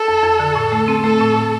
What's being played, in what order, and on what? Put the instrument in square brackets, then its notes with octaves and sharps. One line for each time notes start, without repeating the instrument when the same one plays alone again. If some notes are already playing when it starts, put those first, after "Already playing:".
Already playing: [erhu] A4
[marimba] F2
F2
D3
A2
A3
C4
[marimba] A3 [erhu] A4
[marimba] A2
A2